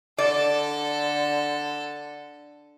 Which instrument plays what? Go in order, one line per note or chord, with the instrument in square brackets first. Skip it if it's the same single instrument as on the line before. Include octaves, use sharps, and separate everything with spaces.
[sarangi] D3 [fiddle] A4 [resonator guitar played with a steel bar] D5